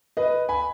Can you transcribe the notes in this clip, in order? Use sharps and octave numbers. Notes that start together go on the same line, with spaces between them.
B4 D#5
G#5 B5